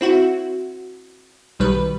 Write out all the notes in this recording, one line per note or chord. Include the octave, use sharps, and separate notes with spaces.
C4 E4 F#4
B1 D#3 G3 B4